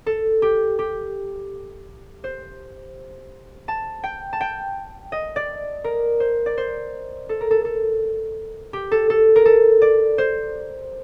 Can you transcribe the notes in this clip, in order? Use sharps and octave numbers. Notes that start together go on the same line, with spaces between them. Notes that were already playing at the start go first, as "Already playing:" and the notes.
A4
G4
G4
C5
A5
G5
A5
G5
D#5
D5
A#4
C5
D5
C5
A4
A#4
A4
A4
G4
A4
A4
A#4
A4
D5
C5